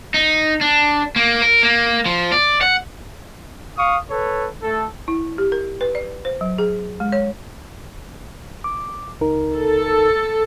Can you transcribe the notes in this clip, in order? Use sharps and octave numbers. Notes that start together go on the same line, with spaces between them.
D#4
D4
A#3
A#4
A#3
F3
D5
F#5
F5 C#6 D#6
A4 B4 C#5
A3 A4
E4
G4
A#4
B4
D5
C5
F#3
G#4
G#3
C#5
D6
C#2 D#4 A#4
A4